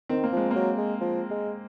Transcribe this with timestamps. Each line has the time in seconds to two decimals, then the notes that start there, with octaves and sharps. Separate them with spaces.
0.09 D#3 C4
0.24 A#3
0.33 F3 G#3
0.51 F#3 A#3
0.78 G#3
1.01 F3
1.31 G#3